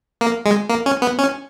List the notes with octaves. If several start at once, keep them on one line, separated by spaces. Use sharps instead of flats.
A#3
G#3
A#3
C#4
B3
C#4